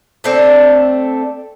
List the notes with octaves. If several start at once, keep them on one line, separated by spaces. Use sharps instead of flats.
A3 C4 D4